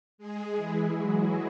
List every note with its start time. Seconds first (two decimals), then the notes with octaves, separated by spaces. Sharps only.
0.18 G#3 G#4
0.56 E3 E4
0.93 F#3 F#4